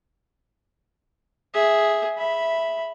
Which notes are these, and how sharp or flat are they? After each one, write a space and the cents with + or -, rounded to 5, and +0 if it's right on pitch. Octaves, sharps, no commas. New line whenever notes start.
G#4 +0 E5 -10
E5 +0 B5 -5